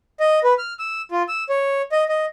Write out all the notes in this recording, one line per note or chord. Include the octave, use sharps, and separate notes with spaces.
D#5
B4
F6
E6
F4
E6
C#5
D#5
D#5